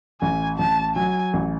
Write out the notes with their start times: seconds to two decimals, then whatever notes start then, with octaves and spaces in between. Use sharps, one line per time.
0.21 A1 G#5
0.58 A1 A5
0.96 F#3 G#5
1.33 A1